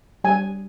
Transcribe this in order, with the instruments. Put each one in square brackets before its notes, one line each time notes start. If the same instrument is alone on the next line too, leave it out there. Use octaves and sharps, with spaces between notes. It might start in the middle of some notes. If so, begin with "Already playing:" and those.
[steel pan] G3 G#5